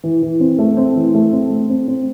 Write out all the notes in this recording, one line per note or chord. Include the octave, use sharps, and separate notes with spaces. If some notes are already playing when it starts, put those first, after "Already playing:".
E3
E3
C4
A3
C4
E3
A3
C4
A3
C4
C4